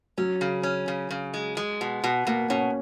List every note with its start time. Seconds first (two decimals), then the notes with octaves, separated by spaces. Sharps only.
0.18 F#3 C#4
0.41 C#3
0.63 C#4
0.88 C#3
1.11 C#3
1.34 G#3
1.57 G#3
1.81 B2
2.04 B2
2.27 B2 A#3
2.49 B2 C#4